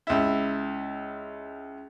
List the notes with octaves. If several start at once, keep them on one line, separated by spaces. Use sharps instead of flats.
C#2 E4